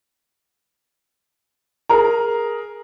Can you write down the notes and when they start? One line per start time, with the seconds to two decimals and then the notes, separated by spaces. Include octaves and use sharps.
1.89 G#4 A#4 A#5